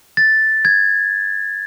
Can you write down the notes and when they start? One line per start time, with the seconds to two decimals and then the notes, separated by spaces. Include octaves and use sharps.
0.17 A6
0.65 G#6